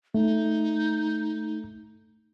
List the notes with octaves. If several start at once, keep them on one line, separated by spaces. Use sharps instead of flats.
A3 D#4